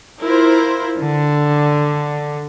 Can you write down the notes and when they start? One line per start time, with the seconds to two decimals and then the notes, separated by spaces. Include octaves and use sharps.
0.21 E4 F4 A#4 C5
0.98 D3